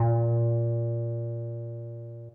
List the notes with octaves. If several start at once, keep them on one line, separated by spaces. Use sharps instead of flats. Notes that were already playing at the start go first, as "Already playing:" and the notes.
Already playing: A#2